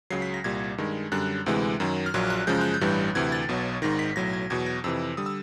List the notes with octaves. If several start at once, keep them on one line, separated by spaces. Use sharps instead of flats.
C#2 C#3 F#3 C7
B6
A#6
C2 A#2 G3 G#6
G2 D#3 G#3
F#2 D3 G3 F#6
D2 C3 E3 G#3
F#2 D#3 F#3
F6
A#1 A#2 F#3 F#6
F#6
F#2 C#3 F3 G#3 G6
F#6
G6
A1 G2 E3 G3
D2 C3 E3 G#6
A6
B1 B2 F#3
G#1 G#2 D#3 A#6
B6
B1 A2 F#3 A#6
G#6
E2 B2 F#3 G#6
A#6
F2 C3 E3 E6
D3 G3 D#6
E6